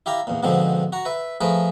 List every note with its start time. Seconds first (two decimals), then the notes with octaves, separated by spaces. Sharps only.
0.06 E4 G4 F5 A#5
0.27 E2 A#2
0.43 G#2 B2 D3 F3 C4
0.92 F#4 A#5
1.05 B4 E5
1.41 F3 A3 G#4 A#4 B4